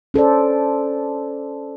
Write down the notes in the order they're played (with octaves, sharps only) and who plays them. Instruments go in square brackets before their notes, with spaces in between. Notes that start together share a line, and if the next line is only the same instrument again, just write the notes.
[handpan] C#4 A4 C5 D5